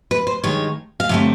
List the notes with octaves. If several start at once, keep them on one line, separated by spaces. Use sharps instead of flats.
B4
C5
G2 D#3 G#3 C#5
F5
G2 D3 F#3 A3 C4 E5